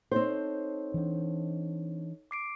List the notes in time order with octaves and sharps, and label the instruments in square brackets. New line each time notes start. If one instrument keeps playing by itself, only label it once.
[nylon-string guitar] C4 C5 [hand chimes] D#4 A4 C#5
[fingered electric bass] E3 D4
[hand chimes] D6 C7 D7